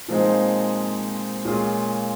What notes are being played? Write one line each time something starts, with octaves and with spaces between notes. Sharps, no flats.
A#2 F3 G#3 C4 D#4
A#2 G#3 C#4 F4 G#4